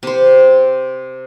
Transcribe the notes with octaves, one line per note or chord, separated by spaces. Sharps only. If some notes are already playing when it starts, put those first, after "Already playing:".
C3 C5